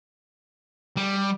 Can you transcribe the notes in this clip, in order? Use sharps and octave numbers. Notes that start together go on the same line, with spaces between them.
G3